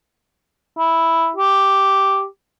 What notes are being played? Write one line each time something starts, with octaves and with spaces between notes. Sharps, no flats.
E4
G4